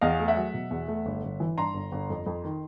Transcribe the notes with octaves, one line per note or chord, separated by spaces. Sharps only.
E2 D#5 F5
A3
E5 F#5
F#3
B2
E2
A3
G1
G1
E3
G2 A#5 C6
G1
G1
F2
F2
D#3